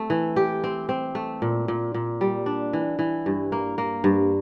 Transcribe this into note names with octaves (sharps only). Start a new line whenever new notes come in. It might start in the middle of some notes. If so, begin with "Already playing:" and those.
Already playing: A3 C4
E3
G4
C4
C4
A3
A#2
A#2
A#2
G3
D4
E3
E3
G2
A#3
A#3
G2